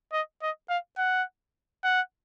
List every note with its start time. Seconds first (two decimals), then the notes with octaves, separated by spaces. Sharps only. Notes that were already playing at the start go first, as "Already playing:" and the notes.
0.13 D#5
0.42 D#5
0.69 F5
0.98 F#5
1.84 F#5